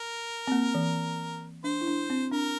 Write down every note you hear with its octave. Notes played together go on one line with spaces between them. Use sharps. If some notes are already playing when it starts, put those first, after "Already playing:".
Already playing: A#4
C4
A#3
E3
D4 C5
E4
D4
C4
D4 A#4